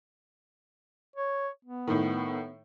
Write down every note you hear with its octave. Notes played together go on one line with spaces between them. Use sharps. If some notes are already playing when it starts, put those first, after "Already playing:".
C#5
B3
A2 D#3